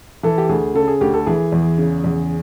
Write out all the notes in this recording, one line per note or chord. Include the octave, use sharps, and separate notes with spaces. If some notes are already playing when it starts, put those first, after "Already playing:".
E3 A4
G4
D2 G#4
C#3 A4
G#4
D2 G4
A4
E3 G#4
E2
C#3
E2